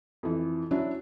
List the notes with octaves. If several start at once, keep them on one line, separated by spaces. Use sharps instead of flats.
F2 E3
F#3 C#4 D4 E4